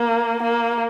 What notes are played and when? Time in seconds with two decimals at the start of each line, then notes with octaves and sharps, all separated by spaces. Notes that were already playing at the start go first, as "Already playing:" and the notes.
Already playing: A#3
0.42 A#3